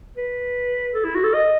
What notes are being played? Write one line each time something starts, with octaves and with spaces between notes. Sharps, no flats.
B4
A4
E4
F#4
A4
D#5